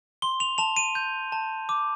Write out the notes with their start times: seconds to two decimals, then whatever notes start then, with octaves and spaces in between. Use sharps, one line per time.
0.22 C6 G7
0.40 F7
0.58 A5 F7
0.77 D#7
0.95 G6
1.32 A5
1.69 D6